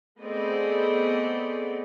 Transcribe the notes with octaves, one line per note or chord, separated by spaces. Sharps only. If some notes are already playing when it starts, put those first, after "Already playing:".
A3 B3 C4 G#4 D5 D#5